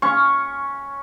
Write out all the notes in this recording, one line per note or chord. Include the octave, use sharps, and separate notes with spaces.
C#4 C#6